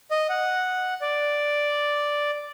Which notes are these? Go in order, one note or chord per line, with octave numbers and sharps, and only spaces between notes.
D#5
F#5
D5